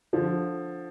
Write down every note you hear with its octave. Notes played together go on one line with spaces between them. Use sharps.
D3 F3